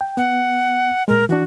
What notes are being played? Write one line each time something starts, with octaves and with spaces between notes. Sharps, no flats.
G5
B3 F#5
A#2 G#3 A#4
E3 D4 F#4